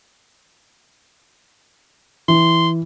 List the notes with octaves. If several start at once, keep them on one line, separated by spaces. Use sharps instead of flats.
E3 C6